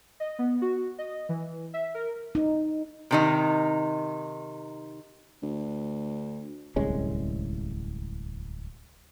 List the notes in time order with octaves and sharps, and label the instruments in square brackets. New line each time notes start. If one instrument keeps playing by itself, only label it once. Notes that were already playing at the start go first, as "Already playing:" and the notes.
[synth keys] D#5
B3
F#4
D#5
E3
E5
A#4
[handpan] D#4
[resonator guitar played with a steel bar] C3 D#3 D#4
[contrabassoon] D2
[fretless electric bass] D1 C2 G#3 C#4